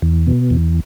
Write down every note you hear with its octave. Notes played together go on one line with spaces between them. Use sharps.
E2
B2
E2